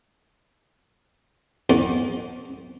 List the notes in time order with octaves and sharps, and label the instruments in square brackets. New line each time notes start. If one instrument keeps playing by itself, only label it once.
[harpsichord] E2